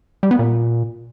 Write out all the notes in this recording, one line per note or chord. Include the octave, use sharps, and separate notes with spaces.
G3
B3
A#2